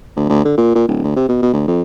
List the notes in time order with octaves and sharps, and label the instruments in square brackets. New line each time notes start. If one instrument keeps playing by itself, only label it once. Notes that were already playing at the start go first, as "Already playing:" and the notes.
[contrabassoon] D2
D2
D3
A#2
A#2
D1
D2
C3
B2
B2
D2
F2